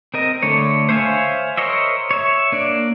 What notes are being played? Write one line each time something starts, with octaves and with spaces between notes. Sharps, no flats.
C4 A#4 D#5
D3 A3 C#5
C5 C#5 E5 F5 G#5
A#4 C5 C#5 D#5 E5
C#5 E5
A#3 D4 D5